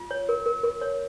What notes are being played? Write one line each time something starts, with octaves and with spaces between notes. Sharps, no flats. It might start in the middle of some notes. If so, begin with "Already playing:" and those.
Already playing: F4
C#5
A#4
A#4
A#4
C#5